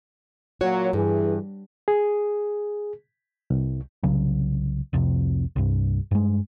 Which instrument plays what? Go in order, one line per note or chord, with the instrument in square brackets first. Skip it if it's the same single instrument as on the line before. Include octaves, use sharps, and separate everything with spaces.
[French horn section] A#2 F#3 [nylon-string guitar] F#4 C#5
[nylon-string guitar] G2 [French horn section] E3 G#4
[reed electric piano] G#4
C2
[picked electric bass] C2 C#3 F#3
F1 C2 F2 C3
C2 G2
G2 G#3